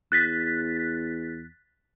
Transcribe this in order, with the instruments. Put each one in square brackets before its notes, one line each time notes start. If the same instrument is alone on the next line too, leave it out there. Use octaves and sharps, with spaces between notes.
[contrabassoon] E2 [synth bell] F#6 A6 B6